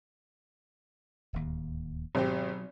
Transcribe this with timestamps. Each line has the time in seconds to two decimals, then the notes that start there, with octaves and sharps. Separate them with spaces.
1.33 D1 D#2
2.15 G#1 B2 F#3 C4 G4